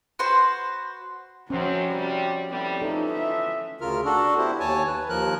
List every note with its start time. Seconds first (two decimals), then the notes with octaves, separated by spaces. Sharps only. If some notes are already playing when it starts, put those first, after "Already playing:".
0.19 F#4 B4 C5 C6
1.50 F#2 F3 C4 C#4 F#4
1.89 C3 G3
2.49 A2 E3 G3 C4
2.82 E3 F3 D#4 A4
3.11 E5
3.81 D2 C#3 F4 A#4 F6
4.05 D4 F#4 A4
4.37 B3 E4 G4 C5
4.60 D#2 C#5 G#5 A5
4.87 B4
5.09 D#2 F3 A#4 F#6